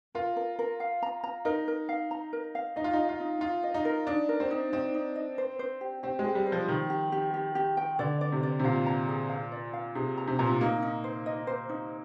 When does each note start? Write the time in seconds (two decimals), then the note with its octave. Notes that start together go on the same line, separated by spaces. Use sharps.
0.15 F4 A#4
0.36 A#4
0.59 A#4
0.80 F5
1.02 A#5
1.24 A#5
1.45 D#4 A#4
1.68 A#4
1.89 F5
2.11 A#5
2.33 A#4
2.55 F5
2.76 D#4 D#5
2.84 F4
2.93 D#4 D#5
3.09 F4
3.20 D#4
3.41 D#4 F4
3.63 D#5
3.74 D#4
3.85 A#4
4.07 D4 D#4
4.29 A#4
4.40 C4
4.51 D#4
4.72 C4 D#4
4.94 D#4
5.16 D#5
5.38 C5
5.59 C5
5.81 G4
6.03 C4 G4
6.19 G#3
6.25 G4
6.35 G3
6.47 C5
6.52 F3
6.68 D#3 G4
6.90 G4
7.12 G4
7.34 G4
7.55 G4
7.77 G5
7.99 D3 D5
8.21 D5
8.32 C3
8.43 D5
8.60 C3
8.64 A#2 F5
8.86 A#5
9.08 G#4
9.30 F5
9.52 D5
9.73 F5
9.95 C3 G#4
10.17 A#5
10.28 C3
10.39 A#2 A#5
10.49 C3
10.61 A#3 D#4
10.83 D#4
11.04 C5
11.26 D#5
11.47 C5
11.69 D#4